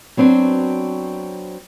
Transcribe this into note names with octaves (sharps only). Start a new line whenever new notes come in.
F#3 B3 C4 D4 F#4